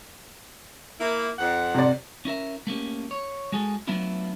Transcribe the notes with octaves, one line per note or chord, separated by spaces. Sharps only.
A#3 E4
F2 F#5
C3 D5
C#4 E4 A#4 E5
A3 A#3 C#4 G4
C#5
G#3 F#4 G#4 A4
F#3 A3 B3 D4 E4 F4